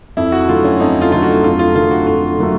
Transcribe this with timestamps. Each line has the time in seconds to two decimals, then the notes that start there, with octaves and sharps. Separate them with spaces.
0.17 F2 E4
0.32 F#4
0.48 D3 F#3 A3 F4
0.64 C#4
0.80 F2 D#4
1.01 F4
1.12 D3 F#3 A3 F4
1.22 F#4
1.44 F2 F4
1.59 F4
1.75 D3 F#3 A3 F4
1.91 F#4
2.07 F2 F4
2.39 D3 F#3 A3